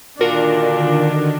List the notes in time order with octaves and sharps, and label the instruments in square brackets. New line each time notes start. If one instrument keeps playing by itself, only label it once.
[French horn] A#2 [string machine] D3 D#3 [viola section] D4 [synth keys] F4 F#4 A#4